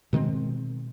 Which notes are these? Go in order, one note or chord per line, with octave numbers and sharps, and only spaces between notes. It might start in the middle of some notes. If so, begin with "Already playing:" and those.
B2 D#3 G#3 C4